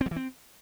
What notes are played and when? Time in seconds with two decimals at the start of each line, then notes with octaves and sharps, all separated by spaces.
0.01 C4
0.06 F#3
0.11 E3
0.16 C4